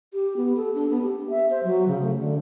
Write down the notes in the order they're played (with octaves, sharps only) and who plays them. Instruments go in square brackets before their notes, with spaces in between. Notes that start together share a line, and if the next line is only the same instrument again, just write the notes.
[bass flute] G4
B3
A4
D4
B3
G4
E5
C5
F#3
C#3
A3
D3